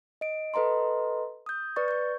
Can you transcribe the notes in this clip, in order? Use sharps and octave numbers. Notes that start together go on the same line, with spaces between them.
D#5 D7
A4 B4 D#5 A#5 C6
D#6 G6
B4 D5 C#6 A6
C#6 G6